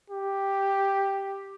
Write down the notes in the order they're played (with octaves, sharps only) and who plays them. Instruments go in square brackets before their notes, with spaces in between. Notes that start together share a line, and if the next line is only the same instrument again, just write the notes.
[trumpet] G4